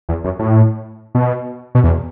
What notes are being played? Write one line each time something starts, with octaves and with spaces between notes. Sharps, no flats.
E2
F#2
A2
B2
B2
E2